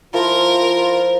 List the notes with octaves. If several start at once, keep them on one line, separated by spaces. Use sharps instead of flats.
F3 E4 F4 A#4 C5